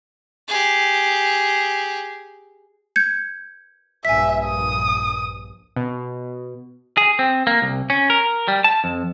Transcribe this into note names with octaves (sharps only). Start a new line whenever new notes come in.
G4 G#4
G6 G#6 C#7
A#1 G2 E5 G#5 B6
D#6
B2
G#4
C4
A#3
C2
C#4
A#4
G3
A5
F2